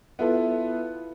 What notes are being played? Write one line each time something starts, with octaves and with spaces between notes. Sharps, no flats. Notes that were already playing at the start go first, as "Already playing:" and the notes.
B3 E4 F4 A4 B4